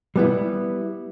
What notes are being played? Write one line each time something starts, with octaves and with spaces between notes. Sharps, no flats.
G3 B3 E4